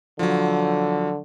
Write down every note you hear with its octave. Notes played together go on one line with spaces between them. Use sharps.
D3 F3 F#3